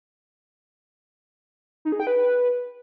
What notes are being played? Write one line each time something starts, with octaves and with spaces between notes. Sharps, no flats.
D#4
G#4
G5
B4